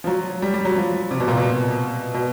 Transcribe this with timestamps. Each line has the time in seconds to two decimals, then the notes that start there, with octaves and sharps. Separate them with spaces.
0.04 F3
0.07 F#3
0.42 G3
0.54 G3
0.65 F#3
0.76 F3
1.11 C3
1.20 B2
1.28 A#2
1.37 B2
2.14 B2